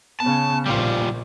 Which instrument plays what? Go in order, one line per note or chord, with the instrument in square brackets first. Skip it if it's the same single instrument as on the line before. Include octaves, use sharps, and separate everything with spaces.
[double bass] C#3 B3 [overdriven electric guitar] A5
[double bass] A#1 [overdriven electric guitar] G3 F4